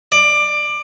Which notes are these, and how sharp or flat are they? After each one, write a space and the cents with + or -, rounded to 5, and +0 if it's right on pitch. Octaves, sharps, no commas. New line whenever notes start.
D5 +20